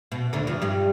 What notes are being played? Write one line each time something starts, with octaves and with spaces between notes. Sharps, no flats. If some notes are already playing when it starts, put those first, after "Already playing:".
B2
D2 D3
F2 F3
G2 G3